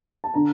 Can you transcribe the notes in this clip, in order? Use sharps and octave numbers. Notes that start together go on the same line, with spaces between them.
A5
D3 A#5